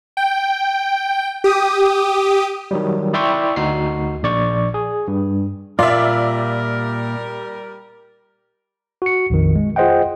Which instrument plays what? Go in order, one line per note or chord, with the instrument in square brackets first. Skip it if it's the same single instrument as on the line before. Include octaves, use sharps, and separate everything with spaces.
[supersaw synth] G5
G4 D#6
[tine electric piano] D#3 F#3 G3
E4 D5 E5 G5 C6 C#6
D2 D#4 F#4 C7
A#1 D5 C#6
G#4
G2
[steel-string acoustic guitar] A#2 [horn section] G3 A#4 [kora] F4 [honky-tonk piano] D5 E5
[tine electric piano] F#4 C#7
A#1 F2 D#3
G#3
F4 G#4 C5 D#5 F#5 G5